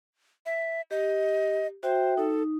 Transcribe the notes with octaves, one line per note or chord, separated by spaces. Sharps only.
E5
G4 D#5
F#4 C5 E5 G5
D#4 A4